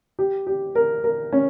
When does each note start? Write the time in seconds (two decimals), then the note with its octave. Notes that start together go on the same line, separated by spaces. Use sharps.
0.19 G4
0.47 G4
0.75 A#4
1.04 A#4
1.33 C#4